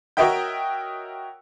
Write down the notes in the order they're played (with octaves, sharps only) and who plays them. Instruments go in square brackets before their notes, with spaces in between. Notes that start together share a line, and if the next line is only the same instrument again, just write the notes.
[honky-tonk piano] F#4 A#4 C#5 D#5 E5 G5